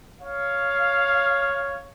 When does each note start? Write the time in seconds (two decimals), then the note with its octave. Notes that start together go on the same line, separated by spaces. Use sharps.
0.21 C#5 F5